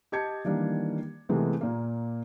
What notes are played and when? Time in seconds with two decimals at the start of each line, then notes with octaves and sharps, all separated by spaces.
0.12 G4 D#5 A5 G#6 C#7
0.44 D#3 E3 G3 A#3 D4
1.29 C3 E3 G#3 A3 B3
1.61 A#2 A#3